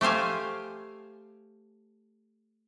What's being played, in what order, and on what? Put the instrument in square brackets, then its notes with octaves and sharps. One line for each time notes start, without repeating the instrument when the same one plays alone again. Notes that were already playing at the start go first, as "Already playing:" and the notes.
[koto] A3 G4 C5 F5 G#5